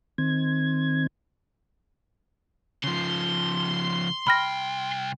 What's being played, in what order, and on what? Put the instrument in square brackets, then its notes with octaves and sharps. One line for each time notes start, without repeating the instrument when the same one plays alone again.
[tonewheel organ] D#3 C4 G#6
[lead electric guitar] C#3 F3 [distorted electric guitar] C6
[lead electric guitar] C2 G5 [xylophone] B5 F6 A#6